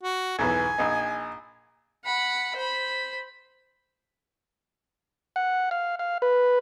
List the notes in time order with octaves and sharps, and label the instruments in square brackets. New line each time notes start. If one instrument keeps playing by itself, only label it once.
[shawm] F#4
[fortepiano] B1 E2 E3 [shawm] G#5
[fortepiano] A#1 D#4
[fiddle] F#5 B5
C5 B5
[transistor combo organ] F#5
F5
F5
B4